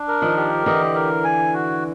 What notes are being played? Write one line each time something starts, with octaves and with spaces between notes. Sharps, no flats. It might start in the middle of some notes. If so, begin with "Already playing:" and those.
Already playing: D4
A#4
D#3 F3
G4
D3 E3 D#5
A#4
G#5
F#4